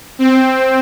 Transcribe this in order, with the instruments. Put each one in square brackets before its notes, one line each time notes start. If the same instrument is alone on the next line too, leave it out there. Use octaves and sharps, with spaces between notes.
[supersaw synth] C4